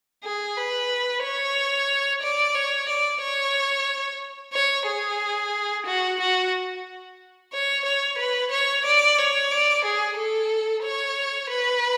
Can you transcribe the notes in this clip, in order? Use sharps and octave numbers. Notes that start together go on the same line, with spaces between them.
G#4
B4
C#5
D5
C#5
D5
C#5
C#5
G#4
F#4
F#4
C#5
C#5
B4
C#5
D5
C#5
D5
G#4
A4
C#5
B4